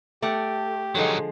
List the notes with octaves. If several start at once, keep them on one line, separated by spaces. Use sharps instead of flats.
A3 G4 D5 F#5
D3 F3 F#3 G#3 D#4